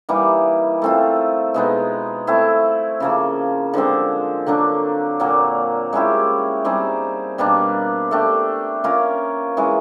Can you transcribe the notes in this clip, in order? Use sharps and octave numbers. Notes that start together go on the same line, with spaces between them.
E3 G3 A#3 D#4
A3 C4 F4
B2 G#3 B3 D#4
A3 C4 E4
C#3 F3 A#3
D3 F3 G#3 C4
D3 F#3 A#3 D4
A#2 F#3 A#3
G#3 C#4 E4 G4
G3 C4 D#4 G#4
B2 G3 A#3 D4
A3 D4 G4
A#3 C#4 F4 A#4
E3 G#3 C#4